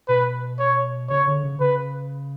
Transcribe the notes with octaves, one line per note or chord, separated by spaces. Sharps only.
B2 B4
C#5
C#3 C#5
D3
C#3
C#3 B4